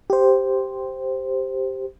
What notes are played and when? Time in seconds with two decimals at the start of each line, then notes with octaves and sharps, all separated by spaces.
0.10 G4 C5